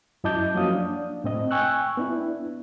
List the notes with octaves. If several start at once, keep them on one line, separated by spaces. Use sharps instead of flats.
F#2 E4 D#5 A5 D6 G6
F3 F#3 A#3 C#4 F5 D#6
D4
A2 C4 D#5
G5 G#5 C#6 E6 F#6
B3 D4 E4